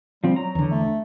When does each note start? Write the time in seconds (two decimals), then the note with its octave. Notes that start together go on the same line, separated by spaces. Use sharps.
0.24 F3 G3 C4
0.36 F#3 A#5
0.55 E2 D3
0.71 A3